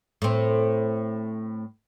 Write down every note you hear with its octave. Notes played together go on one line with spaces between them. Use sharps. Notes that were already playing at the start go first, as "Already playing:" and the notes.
A2 C4